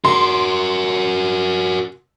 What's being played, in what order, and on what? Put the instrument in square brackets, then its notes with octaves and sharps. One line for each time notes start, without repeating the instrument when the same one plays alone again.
[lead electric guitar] F#4 A#4 [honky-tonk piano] C6